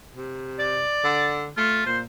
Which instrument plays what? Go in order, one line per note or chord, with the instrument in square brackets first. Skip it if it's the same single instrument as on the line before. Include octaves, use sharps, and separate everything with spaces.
[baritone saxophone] C3
[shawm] D5
[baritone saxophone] D3
[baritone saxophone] A3 [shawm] F4
[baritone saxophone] A#2 [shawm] C5